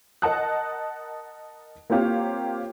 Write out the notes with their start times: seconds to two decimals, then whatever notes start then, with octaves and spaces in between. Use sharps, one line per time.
0.22 A#4 D#5 F#5 A5 D#6 F#6
1.90 A#3 C4 F4 G4 C#5 F5